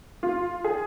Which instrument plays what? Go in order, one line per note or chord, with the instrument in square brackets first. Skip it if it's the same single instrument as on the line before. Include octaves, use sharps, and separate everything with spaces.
[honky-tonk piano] F4
G#4